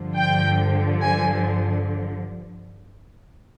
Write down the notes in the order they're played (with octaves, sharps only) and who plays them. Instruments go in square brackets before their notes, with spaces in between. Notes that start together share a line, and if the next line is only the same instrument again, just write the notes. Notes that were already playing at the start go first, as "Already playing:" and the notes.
Already playing: [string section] G2 D3 F3
G5
G#5